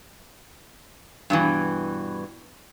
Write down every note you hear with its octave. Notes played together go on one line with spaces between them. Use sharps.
G2 B2 E3